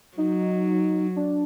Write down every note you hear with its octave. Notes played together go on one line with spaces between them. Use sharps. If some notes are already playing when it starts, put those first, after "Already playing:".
F#3 D#4
D4